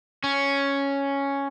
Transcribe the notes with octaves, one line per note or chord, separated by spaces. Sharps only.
C#4